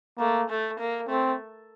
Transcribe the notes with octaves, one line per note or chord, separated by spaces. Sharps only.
A3 A#3
A3
A#3
A3 C4